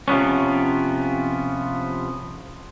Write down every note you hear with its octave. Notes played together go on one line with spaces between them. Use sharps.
C3 F3 B3 C#4